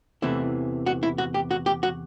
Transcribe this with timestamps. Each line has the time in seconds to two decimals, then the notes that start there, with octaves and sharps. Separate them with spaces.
0.22 E2 C3 E3 A3 E4
0.86 F#4
1.03 E4
1.18 F#4
1.34 G4
1.51 F#4
1.66 G4
1.83 F#4